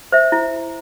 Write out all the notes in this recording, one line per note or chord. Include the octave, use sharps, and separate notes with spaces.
C5 E5
E4